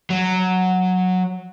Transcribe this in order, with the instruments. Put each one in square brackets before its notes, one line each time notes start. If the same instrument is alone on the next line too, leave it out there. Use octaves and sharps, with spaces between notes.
[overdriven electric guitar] F#3